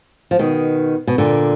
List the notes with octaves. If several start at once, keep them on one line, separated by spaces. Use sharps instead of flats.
F3
B2 D#3
B2
A#2 D3